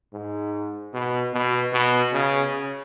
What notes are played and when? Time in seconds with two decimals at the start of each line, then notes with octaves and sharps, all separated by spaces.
0.13 G#2
0.93 B2
1.33 B2
1.73 B2
2.13 C#3